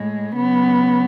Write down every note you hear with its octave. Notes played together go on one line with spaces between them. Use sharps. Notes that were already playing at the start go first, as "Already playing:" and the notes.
Already playing: A2 G#3
C#3 F#3 B3